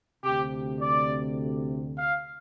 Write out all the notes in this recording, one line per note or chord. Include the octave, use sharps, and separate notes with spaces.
D2 C3 G4
D5
F5